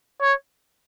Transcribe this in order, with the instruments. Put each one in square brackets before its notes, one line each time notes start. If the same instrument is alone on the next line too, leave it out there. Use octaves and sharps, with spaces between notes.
[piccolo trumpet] C#5